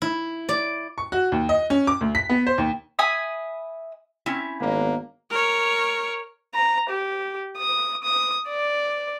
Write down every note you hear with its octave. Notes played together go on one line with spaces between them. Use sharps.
E4
D5
C#6
F#4
D#2
D#5
C#4
D6
D2
B6
B3
C5
D#2
E5 G#5 B5 D#6
C4 C#4 E4
G#1 A#3 B3 D4 D#5
A#4 C#5
A#5
G4
D#6
D#6
D5